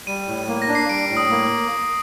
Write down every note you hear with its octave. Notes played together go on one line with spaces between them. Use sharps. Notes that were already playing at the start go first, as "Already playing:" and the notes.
G3 D#7
A2
A#3
A#6
D4
C7
G3 D7
A2
D#6
A#3